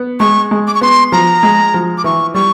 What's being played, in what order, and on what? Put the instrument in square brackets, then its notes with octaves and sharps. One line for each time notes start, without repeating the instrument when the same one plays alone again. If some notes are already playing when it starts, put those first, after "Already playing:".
Already playing: [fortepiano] B3
[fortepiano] G#3 [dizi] C#6
[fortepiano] G#3
[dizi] D6
C#6
[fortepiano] B3 [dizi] C6
[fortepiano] F3 [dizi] A#5
[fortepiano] G#3
F3
[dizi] D6
[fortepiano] E3 [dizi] C#6
[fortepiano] G3 [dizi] C#6